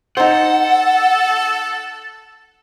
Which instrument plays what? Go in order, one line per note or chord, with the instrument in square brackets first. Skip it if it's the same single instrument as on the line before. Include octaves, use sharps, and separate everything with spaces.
[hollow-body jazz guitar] D#4 C5 [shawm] A4 [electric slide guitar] F#5